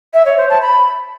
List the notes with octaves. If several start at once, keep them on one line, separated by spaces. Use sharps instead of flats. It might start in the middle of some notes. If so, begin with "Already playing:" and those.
E5
C#5
C5
A5
B5